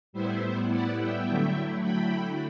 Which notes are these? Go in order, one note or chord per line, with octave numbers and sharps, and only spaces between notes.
A2 G3 B3 E4 C5 E5
D5 F#5
E5 G5
D3 F#3 A3 E4
G5 B5